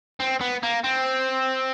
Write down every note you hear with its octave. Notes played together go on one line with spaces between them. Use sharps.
C4
B3
A#3
C4